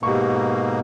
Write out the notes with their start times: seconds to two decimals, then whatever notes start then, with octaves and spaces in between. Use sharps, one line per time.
0.03 G#2 B2 A#3 G4 C#6